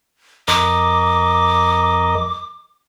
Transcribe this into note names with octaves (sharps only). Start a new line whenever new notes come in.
F2 A#4 D#5 D6